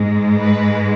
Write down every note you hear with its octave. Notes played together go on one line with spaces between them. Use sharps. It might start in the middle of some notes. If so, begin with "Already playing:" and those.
Already playing: G#2 G#3
B4